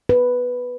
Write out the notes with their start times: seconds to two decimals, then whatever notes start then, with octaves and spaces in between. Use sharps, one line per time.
0.09 B4